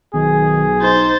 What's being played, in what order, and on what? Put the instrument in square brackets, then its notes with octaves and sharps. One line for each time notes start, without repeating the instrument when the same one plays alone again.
[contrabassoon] B1 [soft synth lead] D#3 [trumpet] G#4
[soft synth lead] D#4 [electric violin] C5 A6